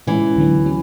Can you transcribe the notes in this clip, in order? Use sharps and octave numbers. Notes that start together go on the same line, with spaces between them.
A2 E3 G#3 C#4 E4
D2 D3 F#3 B3
F#3 C#4